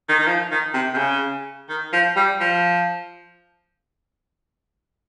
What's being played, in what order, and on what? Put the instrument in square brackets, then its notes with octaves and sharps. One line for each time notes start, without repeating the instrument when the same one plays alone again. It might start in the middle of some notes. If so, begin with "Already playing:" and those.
[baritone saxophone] D#3
D#3
F3
D#3
C3
C3
C#3
D#3
F3
G3
F3